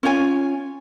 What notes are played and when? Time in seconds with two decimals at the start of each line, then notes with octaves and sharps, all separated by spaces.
0.03 C#4 F4 C#5 G#5